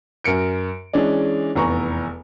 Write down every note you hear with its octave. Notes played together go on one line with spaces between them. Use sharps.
F#2 A#4 C#7 D7
E3 G#3 C#4 D4
F1 E2 A#5 C#6